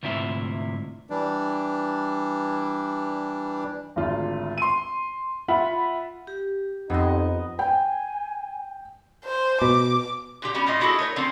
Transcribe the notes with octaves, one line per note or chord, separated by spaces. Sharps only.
D2 G#2 C3 E4 F4 E5
E3 G3 D4
G#1 D2 F4
C6 D#7
F4 E5 F#5 B5
G4
F2 B3 D#4 D#5
G5 G#5
C5
B2 D6
A#2 D3 G4
G3 B3 C#4 F#4
A2 A#3 F4 D#5
D4 E4 F#4 G#4 A4
A3 A#4 C#5
D3 F3 A#3 C4 C#4